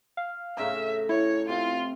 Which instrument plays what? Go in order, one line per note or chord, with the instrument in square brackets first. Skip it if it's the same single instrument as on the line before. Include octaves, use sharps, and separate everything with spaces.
[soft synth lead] F5
[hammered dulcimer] A2 C#3 A#5 [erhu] E5
[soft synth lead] E4 [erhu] C#5
[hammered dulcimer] C3 [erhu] F4